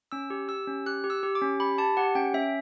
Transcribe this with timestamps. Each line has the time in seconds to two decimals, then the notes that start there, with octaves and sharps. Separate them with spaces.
0.12 C#4 E6
0.30 G4
0.48 G4 E6
0.67 C#4
0.86 G4 F#6
1.04 G4
1.10 E6
1.23 G4
1.35 D6
1.42 C#4
1.60 G4 B5
1.78 G4 A5
1.97 G4 F#5
2.15 C#4 G5
2.34 C#4 E5